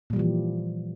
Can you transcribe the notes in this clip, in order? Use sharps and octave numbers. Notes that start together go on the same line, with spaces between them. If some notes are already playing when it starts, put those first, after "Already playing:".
A#2 E3 F3 G3